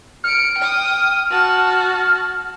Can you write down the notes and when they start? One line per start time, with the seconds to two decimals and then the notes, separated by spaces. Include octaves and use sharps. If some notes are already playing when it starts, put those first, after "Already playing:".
0.24 F6 C#7 D7
0.58 G5 D#6
1.31 F#4 A5